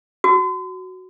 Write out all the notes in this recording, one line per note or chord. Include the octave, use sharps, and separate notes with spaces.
F#4